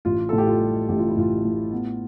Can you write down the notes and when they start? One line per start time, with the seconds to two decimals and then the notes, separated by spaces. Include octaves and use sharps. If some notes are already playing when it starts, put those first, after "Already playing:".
0.05 A1 F4
0.29 A2 A4
0.38 G4
0.47 F4
0.61 G3
0.89 A1 G4
0.99 F4
1.08 E4
1.17 A1 F4
1.45 A2
1.72 B3